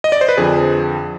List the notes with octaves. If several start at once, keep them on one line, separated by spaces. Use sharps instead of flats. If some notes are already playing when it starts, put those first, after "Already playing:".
D#5
D5
C5
B4
F2 D3 F3 G#4